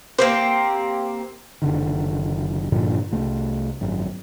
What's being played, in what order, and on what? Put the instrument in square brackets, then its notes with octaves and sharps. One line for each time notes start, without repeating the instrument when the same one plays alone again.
[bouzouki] A#3 C4 G4 [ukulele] C5
[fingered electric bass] F#1 D3 D#3
G2 A#2 D3 F3
C2 A3
G#1 F#2